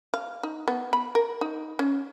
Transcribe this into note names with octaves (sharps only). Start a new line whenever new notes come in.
F5
D#4
B3
B5
A#4
D#4
C#4